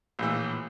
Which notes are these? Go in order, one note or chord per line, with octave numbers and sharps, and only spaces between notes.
A#1 A2 E3